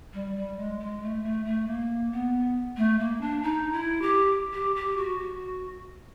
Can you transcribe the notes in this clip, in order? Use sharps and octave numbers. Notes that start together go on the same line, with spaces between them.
G3
G3
G#3
G#3
A3
A3
A3
A#3
B3
A3
A#3
D4
D#4
E4
G4
G4
G4
F#4
F#4